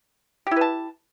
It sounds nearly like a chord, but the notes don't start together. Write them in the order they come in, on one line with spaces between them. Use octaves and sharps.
G4 E4 B4 A5